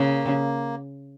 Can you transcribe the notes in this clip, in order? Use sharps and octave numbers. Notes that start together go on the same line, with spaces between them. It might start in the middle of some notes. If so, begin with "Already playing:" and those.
Already playing: C#3 A#3